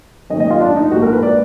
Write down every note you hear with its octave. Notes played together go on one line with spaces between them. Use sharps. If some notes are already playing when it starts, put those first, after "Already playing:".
F#2 D#3 A#3 D#5
D#5
F4
D4
D#4
A#1 G#2 F3 G#3 F#4
A#4
B4
D5